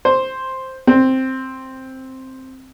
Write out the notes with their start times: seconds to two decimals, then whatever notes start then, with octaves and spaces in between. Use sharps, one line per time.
0.05 C5
0.87 C4